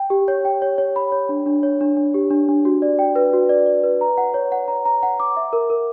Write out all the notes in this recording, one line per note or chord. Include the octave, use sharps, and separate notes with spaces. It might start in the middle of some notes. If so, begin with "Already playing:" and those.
Already playing: G5
G4
C#5
G5
C#5
C#5
B5
C#5
D4
D4
C#5
D4
D4
G4
D4
D4
F#4
D5
G5
B4
F#4
D5
D5
B4
A#5
F#5
C#5
F#5
A#5
A#5
F#5
D6
E5
A#4
A#4